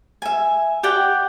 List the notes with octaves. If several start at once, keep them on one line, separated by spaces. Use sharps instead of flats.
E5 G#5
G4 D5 F#5 G5